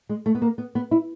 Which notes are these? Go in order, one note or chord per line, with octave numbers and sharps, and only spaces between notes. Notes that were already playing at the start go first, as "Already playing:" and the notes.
G#3
A3
B3
A#3
B3
B3
E4